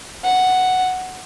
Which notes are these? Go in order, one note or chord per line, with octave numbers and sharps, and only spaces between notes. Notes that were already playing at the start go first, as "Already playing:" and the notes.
F#5